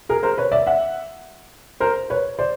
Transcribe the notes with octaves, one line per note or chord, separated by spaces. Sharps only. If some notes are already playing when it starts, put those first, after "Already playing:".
G#4 A#4
A#4 C5
B4 C#5
D5 E5
E5 F#5
A#4 C5
B4 C#5
C5 D5